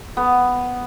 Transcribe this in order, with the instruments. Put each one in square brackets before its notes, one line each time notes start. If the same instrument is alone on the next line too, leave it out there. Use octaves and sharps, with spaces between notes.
[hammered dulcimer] B3